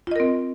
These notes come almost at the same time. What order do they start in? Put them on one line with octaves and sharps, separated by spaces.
F4 D#5 A#4 C4